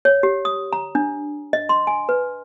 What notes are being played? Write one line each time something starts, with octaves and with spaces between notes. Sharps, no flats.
C#5
G4
D#6
A#5
D4
D#5
C6
G#5
B4